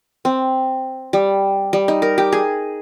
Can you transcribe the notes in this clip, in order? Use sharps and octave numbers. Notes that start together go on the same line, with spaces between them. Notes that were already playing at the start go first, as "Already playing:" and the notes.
C4
G3
G3
D#4
A#4
G4
G#4